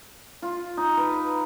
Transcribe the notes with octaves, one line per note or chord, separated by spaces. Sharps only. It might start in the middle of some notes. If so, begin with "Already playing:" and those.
F4
D#4
B4